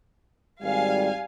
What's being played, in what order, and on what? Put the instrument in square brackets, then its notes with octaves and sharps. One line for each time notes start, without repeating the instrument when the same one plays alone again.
[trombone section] G#1 G3 [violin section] F5 G#5